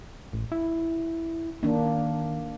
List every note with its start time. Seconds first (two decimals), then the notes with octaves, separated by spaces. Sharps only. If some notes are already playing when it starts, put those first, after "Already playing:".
0.33 A1
0.52 E4
1.63 D#3 A#3 D4